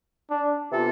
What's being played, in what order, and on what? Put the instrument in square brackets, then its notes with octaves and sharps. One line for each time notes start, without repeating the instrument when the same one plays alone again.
[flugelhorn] D4
[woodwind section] C3 E3 B3 F4 A4